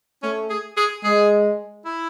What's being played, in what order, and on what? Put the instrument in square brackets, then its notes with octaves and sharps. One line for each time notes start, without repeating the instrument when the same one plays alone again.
[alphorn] A3 [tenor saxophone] C#4
[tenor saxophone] G#4
G#4
[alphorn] G#3 [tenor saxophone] G#4
[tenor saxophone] E4